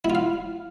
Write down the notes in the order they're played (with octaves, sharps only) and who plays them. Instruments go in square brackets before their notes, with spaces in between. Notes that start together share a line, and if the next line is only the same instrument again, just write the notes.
[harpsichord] E4
F4
F5